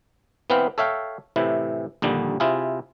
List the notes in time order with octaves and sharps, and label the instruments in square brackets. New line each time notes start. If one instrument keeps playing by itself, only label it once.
[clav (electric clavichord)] E3 B3 C4 B4 F5 G5
A4 C#5 E5 F5 G5
A2 C3 E3 E4
A#1 D#2 D3 G3
C3 E4 F4 G#4